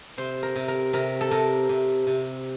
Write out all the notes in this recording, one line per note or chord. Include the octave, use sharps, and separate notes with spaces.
C3 C5
A#4
C3
A#4
C3 A#4
A4
C3 A#4
C3
C3